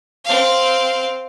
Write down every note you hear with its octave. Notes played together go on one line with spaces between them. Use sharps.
C4 F5